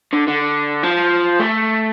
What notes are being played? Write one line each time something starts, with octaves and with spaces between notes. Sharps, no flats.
D3
D3
F3
A3